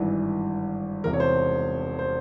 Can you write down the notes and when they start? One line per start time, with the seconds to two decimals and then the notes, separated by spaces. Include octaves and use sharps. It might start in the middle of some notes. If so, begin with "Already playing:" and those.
Already playing: G#1 G2 E3
1.04 E1 E2 C3 E3 A#4
1.13 C#5
1.20 C5
1.99 C5